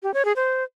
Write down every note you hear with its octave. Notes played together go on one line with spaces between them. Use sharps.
G4
C#5
G#4
C5